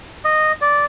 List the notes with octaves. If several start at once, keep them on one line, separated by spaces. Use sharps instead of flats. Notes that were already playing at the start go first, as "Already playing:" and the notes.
D#5
D5